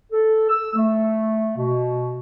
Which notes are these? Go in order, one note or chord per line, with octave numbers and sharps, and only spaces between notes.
A4
E6
A3
B2